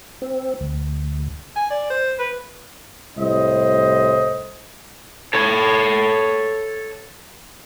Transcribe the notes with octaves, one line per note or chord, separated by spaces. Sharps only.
C4
D2
G#5
D5
C5
B4
C2 A2 C5 D#5
A4 C#5